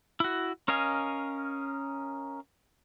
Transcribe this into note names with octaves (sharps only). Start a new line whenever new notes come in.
E4 F#4
C#4 A#4 D#5 F5 G#5